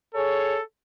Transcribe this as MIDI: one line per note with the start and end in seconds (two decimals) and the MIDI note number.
0.14 0.57 68
0.14 0.62 69
0.14 0.57 73